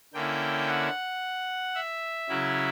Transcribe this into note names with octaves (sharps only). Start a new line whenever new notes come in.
D3 A#3 C#4 E4 G5
F#5
E5
C#3 F#3 C#4 E4